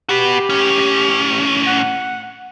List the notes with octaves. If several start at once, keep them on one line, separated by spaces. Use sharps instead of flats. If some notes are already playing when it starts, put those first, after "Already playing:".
F#4 G4 B4
A2 C#4
F#5